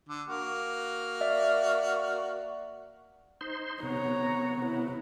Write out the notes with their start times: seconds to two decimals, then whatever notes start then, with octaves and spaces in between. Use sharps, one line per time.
0.09 D3
0.28 A#3 F#4 F6
1.21 D5 E5
3.41 D#4 C5 C6
3.83 C3 B3 C#5 A#5
4.66 E4